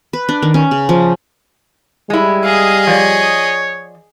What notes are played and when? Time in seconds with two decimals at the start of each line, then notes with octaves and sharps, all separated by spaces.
0.13 B4
0.29 D4
0.42 D#3
0.54 C#4
0.71 C#3
0.89 F3
2.10 G3 G#3 E4
2.44 G#4 D#5 F5
2.87 F3 C#5 D5